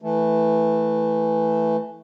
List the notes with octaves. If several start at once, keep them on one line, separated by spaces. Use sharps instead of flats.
E3 A3